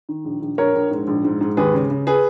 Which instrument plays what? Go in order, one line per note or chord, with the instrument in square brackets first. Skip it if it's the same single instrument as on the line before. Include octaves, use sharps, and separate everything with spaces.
[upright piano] D#3
A#1
A#1
A#1 A#4 C#5
A#1
G#2
A#1
G#2
G#2
D#2 G#4 B4
C#3
C#3
G#4 B4